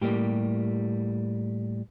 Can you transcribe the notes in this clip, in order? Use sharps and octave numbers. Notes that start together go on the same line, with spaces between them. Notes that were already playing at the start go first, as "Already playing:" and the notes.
A2 G3 A#3 G4